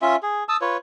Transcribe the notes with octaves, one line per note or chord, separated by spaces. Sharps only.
C#4 F4 E5
G#4
A5 D#6 E6
F4 B4 C#5